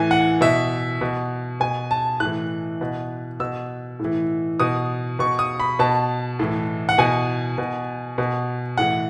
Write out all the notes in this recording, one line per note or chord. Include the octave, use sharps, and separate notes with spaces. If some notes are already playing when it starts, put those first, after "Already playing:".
Already playing: A2 E3 G#5
F#5
B2 E5
B2
B2 G#5
A5
A2 E3 F#6
B2
B2 E6
A2 E3
B2 D#6
B2 C#6
D#6
B5
B2 A5
A2 E3
F#5
B2 G#5
B2
B2
A2 E3 F#5